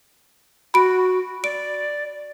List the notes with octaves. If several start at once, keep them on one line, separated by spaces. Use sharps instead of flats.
F#4 B5 D7
D5 D7